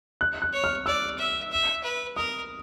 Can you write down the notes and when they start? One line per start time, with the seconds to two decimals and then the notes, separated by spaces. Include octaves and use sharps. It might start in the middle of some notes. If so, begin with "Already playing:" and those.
0.21 F#6
0.42 F#6
0.52 C#5
0.64 F6
0.86 D5 E6
1.18 E5
1.51 E5
1.83 B4
2.16 A#4 D#6